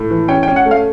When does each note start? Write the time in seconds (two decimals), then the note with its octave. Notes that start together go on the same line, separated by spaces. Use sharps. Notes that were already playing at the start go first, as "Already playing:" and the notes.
Already playing: A2
0.10 E3
0.28 C#4 G5
0.43 G5
0.48 C#4
0.56 F#5
0.66 A3
0.71 F5